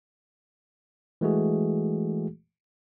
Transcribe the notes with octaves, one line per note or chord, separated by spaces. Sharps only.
E3 G#3 A3 F#4 G#4